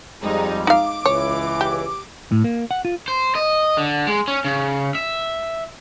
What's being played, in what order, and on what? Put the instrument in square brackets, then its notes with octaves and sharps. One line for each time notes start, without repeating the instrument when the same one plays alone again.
[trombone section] F2 G3 [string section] G#3 D#4
[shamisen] D#4 F5 [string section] D6
[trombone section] C#2 E3 [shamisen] C#5
[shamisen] G4
[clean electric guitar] A2
A#3
F#5
F4
[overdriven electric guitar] C5
D#5
D3
G#3
C#4
C#3
E5